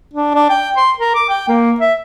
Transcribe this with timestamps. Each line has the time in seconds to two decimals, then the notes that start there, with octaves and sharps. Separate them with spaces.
0.13 D4
0.34 D4
0.50 G5
0.77 C6
0.98 A#4
1.15 D6
1.29 G5
1.48 A#3
1.80 E5